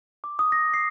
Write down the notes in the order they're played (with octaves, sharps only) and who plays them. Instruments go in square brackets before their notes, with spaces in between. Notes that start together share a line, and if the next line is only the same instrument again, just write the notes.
[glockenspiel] D6
D#6
A#6
C7